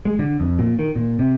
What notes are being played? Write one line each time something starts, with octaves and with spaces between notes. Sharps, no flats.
G#3
D3
F2
A#2
D#3
A#2
C3